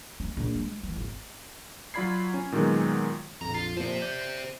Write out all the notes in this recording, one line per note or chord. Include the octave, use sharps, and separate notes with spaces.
C#4
A#1
G#3
E3
G#1
F#3 F4 D5 B5 G#6 C7
C#4
A#2 D#3 F#3 G#3 B3
A#1 F2 A#5
F4
A#2 F3 G4 C5
D5 G6